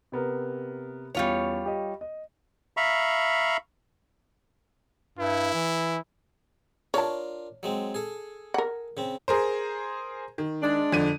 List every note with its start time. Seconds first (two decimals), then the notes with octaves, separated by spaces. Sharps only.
0.12 C3 B3 A#4
1.15 E2 G3 C#4 F4 C#5
1.65 G4 D#5
2.01 D#5
2.77 E5 F5 A#5 B5 C#6
5.18 G2 E4
5.54 E3
6.94 D4 F4 A#4 C#5 A5
7.63 F#3 G#3 C4
7.94 G#4 A4
8.54 A#4 F#5
8.97 C#3 C4
9.28 G#4 A#4 C5
10.38 D#3
10.62 G#3 D4
10.92 F2 D3 D#7